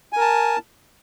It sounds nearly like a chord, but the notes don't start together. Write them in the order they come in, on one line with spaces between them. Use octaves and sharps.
G#5 A#4 A5